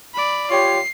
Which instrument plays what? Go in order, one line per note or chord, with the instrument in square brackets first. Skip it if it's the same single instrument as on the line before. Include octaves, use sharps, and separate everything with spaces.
[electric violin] D5 B5
[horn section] F4 G4 C#5 [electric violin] C7